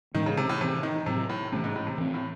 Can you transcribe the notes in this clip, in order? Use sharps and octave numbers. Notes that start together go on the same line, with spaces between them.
A2 D#3 E3 G#3 C#4
C#3
C3
A2
C3 E3 C4
D#3
A2 C3 F#3 C4
A2
C3 E3 A3 C#4
G#2
A2
C3
E3 C4
A2